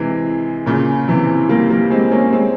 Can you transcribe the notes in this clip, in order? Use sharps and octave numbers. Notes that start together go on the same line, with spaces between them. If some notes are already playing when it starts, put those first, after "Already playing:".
Already playing: C3 E3 G#3
A#2 C#3
C3 E3
G3 A#3
G3 A#3
G#3 C4
A#3 C#4
G#3 C4